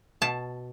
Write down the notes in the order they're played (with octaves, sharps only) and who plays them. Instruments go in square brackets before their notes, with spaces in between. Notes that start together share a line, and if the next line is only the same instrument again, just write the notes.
[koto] B2 A5